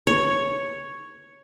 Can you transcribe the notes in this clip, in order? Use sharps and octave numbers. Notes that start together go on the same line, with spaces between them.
C#5